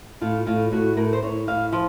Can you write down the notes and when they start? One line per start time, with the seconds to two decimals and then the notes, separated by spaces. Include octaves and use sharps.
0.21 A2 F4
0.46 A2 F4
0.72 A2 F#4
0.97 A2 A#4
1.13 C5
1.22 A2 C#5
1.47 A2 F5
1.72 F3 F5